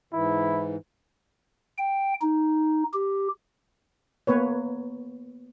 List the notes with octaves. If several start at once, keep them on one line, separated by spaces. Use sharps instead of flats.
G#2 E3 E4
G5
D#4
G4
A#3 B3 B4 C#5